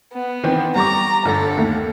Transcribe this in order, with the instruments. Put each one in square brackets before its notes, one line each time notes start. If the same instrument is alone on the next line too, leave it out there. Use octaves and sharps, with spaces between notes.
[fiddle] B3
[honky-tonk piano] D#3 E3 C4
[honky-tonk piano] G3 C#6 D6 [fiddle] A#5
[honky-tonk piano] G1 D3 [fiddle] A4
[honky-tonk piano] D#2 A3 A#3